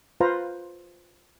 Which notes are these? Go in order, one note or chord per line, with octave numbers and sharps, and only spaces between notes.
F4 B4 C5 F5 A#5